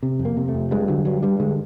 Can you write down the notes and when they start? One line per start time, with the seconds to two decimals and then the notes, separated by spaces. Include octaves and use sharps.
0.03 C3
0.19 F2
0.25 A#3
0.37 C3
0.49 A3
0.54 F2
0.71 G2 G#3
0.88 D3 F#3
1.05 G2 F#3
1.23 G2 G3
1.40 D3 G#3